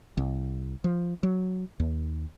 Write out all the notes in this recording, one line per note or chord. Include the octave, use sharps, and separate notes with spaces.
C2
F3
F#3
D#2